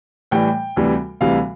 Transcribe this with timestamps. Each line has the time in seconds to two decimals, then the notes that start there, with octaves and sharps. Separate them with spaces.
0.31 A2 E3 G3 G5
0.76 D2 C3 E3 G3
1.21 D2 C3 E3 G3 F5